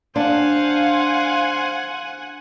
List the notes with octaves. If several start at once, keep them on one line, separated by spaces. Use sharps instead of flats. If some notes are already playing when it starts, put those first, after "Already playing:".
D4 C5 F5 F#5 G#5